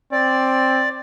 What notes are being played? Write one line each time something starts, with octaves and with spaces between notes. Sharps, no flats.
C4 D5